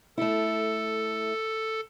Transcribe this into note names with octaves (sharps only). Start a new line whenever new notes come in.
A3 E4 A4